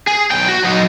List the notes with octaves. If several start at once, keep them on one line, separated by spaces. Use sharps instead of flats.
G#4
B1 G5
F#4
F#3 D#4